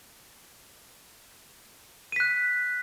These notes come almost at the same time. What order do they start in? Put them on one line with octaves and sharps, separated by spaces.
D#7 B6 F#6